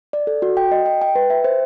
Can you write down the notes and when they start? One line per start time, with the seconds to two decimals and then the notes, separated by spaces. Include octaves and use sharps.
0.13 D5
0.27 A4
0.42 F#4
0.57 G5
0.72 D#5
0.86 G5
1.02 G5
1.15 B4
1.30 E5
1.44 C5